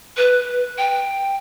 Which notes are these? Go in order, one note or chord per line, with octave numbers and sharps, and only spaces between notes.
B4
G5